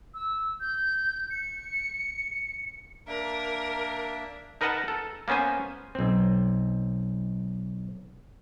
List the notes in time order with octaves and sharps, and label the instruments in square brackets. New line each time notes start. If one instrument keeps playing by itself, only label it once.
[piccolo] E6
G6
C#7
[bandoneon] A#3 D4 E5 [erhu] A#4
[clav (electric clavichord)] D#4 A#4 B4 D#5 F#5 A5
A4
A#3 B3 C#4 C5 G#5
B1 C4